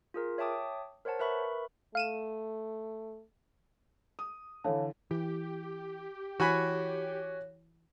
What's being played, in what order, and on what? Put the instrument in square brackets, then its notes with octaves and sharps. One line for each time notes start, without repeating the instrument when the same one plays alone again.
[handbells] F4 G#4 A#4
C#5 E5 G5 A5 D6 D#6
A#4 C5 C#5 F#5 A5
A#4 B4 E5 B5 C#6
[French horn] A3 [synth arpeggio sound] F5 D#7 E7
[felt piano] D#6
[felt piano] D3 E3 [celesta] C#5 F5 A5
[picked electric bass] E3 [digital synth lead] G4
[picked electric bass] E3 [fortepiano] F#4 G#5 B5 [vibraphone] C#5